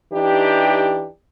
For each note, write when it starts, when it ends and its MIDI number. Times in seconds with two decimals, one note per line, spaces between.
0.13 1.09 52
0.13 1.09 62
0.13 1.09 63
0.13 1.09 67